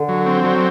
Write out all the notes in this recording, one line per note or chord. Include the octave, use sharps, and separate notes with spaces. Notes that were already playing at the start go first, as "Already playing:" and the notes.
Already playing: D3
F#3
C4
F#3